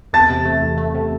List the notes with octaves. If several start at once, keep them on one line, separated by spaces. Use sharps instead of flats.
E2 A5 A6
C3
A3
E2
A3
C3